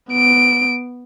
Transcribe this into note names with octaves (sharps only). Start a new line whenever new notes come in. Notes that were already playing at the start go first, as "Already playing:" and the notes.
B3 D7